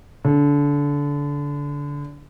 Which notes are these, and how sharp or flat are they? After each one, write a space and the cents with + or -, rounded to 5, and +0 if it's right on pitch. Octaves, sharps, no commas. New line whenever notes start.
D3 -25